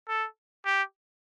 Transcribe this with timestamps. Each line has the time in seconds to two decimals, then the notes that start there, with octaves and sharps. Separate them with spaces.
0.08 A4
0.65 G4